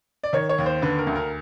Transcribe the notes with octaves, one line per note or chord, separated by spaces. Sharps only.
D5
D#3 C#5
C#5
D#2
C5
D3 B4
A#4
D2
A#4